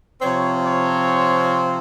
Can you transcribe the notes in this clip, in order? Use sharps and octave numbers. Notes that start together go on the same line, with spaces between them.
C3 F3 C4 C#5
C#5